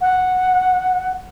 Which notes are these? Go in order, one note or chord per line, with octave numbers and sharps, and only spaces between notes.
F#5